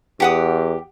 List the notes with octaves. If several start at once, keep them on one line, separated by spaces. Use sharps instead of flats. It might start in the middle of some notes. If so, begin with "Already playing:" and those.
E2 G4 F#5 D#6